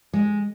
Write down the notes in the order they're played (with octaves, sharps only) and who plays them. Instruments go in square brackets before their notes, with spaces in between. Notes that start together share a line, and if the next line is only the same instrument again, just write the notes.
[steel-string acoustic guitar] G#3